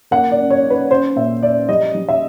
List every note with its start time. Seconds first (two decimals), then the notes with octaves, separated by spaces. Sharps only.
0.11 A#3 F#5
0.32 D5
0.38 C#4
0.50 C#5
0.65 C#4
0.70 B4
0.90 C#4 C5
1.16 A#2 E5
1.43 C#4 D5
1.69 G3 D#5
1.95 G3
2.09 E5